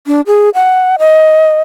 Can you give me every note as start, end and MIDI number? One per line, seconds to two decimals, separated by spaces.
0.07 0.21 62
0.27 0.49 68
0.55 0.96 78
0.99 1.62 75